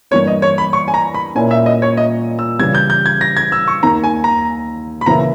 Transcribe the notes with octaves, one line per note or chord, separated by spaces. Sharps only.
G2 E3 A#3 C#5
D#5
C#5
B5
C#6
G#5
A#5
B5
A#2 A#3 C#4 E4 G#5
E5
D#5
C#5
D#5
E6
C#3 E3 G3 G#6
G6
G6
G#6
A#6
G#6
E6
C#6
D#2 D#3 A#3 D#4 A#5
G#5
A#5
B5
C#3 E3 A#3 E4 A#5